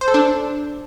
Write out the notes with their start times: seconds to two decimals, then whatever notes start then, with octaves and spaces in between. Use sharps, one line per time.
0.01 C5
0.08 A4
0.14 D4